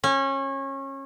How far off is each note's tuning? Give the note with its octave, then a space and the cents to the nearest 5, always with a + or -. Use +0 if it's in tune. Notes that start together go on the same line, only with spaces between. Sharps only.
C#4 -25